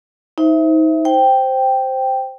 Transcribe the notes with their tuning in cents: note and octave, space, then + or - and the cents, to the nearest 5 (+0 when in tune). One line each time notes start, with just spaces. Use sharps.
D#4 +30 C5 +0 E5 +0
C5 +0 G5 -5